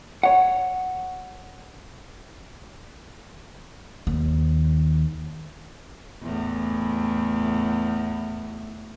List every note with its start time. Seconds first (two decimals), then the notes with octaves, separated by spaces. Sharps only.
0.23 C#5 F#5
4.07 D#2
6.23 E2 A2